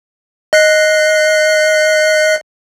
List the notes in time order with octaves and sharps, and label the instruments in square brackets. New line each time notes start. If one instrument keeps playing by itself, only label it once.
[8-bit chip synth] D#5 F#6 C7